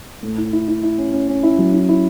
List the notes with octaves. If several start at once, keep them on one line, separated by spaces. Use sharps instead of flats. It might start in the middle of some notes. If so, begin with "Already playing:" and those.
A2
E4
E4
E4
E4
C#4
C#4
C#4
E4
F#3
E4
E4